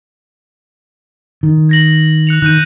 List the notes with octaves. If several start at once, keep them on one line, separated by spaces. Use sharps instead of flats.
D#3
G#6 A#6 F#7
F#6 C#7 F7
D#3 F#6 G6 D#7